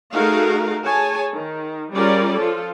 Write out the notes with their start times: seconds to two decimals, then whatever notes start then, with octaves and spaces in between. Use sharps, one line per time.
0.14 A3 D#4 F#4 G#4 A#4 F5
0.84 G#4 C#5 G#5 A5
1.33 D#3
1.93 G3 C#4 F4 G#4 A#4 D5
2.36 F3 F4 A4